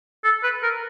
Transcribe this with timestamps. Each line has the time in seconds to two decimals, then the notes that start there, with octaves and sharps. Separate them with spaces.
0.24 A4
0.43 B4
0.63 A#4